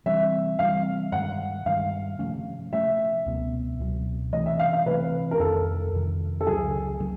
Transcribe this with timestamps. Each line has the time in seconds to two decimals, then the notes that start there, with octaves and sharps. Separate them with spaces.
0.06 C3 E3 G3 C4 E5
0.59 C3 E3 G3 C4 F5
1.12 G2 D#3 G#3 F#5
1.65 G2 D#3 G#3 F5
2.19 C3 F3 A3 C#4
2.72 C3 F3 A3 C#4 E5
3.26 C#2 B2 F#3 B3
3.80 C#2 B2 F#3 B3
4.33 C3 E3 A3 D#5
4.46 E5
4.59 F5
4.73 F5
4.86 C3 E3 A3 B4
5.31 A#4
5.39 F2 C3 D#3 A4
5.93 F2 C3 D#3
6.41 A4
6.47 C#2 C#3 F#3 G#4
7.00 C#3 F#3